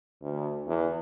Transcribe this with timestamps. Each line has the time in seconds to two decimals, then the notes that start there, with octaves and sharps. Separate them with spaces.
0.22 D2
0.68 E2